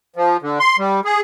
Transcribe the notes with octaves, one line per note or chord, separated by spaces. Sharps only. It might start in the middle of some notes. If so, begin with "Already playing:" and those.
F3
D3
C6
G3
G#4